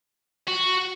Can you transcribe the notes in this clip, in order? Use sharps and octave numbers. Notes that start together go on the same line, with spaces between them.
F#4